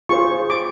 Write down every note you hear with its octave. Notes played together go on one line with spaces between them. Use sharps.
F4 G#4 C5 C#6
D6